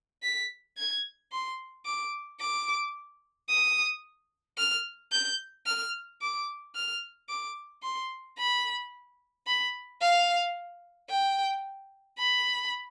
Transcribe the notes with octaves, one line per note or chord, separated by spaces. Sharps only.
B6
G#6
C6
D6
D6
D#6
F6
G6
F6
D6
F6
D6
C6
B5
B5
F5
G5
B5